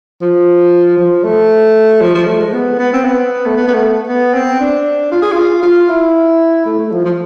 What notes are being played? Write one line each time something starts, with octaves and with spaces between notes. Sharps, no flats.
F3
F3
A3
F3
F3
A3
G#3
B3
B3
C4
B3
A3
B3
B3
A3
B3
C4
D4
F4
G#4
F4
F4
E4
A3
A3
F3
F3